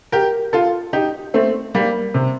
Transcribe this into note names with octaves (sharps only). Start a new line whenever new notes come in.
G4 A#4
F4 A4
D#4 G4
A3 C4
G3 A#3
C3